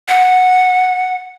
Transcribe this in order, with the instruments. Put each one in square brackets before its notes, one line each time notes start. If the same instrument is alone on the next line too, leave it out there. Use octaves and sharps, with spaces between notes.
[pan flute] F#5